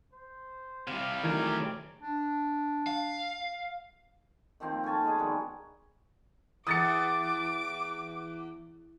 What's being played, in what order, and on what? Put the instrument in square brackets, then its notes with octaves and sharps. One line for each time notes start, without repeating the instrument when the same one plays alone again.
[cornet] C5
[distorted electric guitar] C3 G3 [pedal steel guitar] F5
[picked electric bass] D#3 E3 F#3 [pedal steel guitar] A3 G#4 D5 [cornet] A#4
[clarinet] D4
[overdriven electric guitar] F5
[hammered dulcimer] D#3 F3 A#3 C4
C#4 A4 G#5 A5
G#3 B3 G#4
B2 D#3 F#3 G3
[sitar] E2 [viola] D6 [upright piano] D#6 A6 C#7